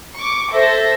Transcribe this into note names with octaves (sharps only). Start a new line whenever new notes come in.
C#6 D6
A4 C5 E5 A#6